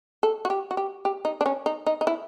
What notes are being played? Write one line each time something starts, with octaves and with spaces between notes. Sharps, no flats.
A4
F#4
G4
F#4
G4
G4
D#4
D4
C#4
D#4
D#4
D#4
E4